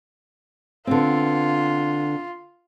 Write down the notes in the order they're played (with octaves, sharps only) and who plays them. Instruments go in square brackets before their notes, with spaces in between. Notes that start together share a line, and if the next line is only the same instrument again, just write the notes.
[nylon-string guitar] D3 B3 C4 [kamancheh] F4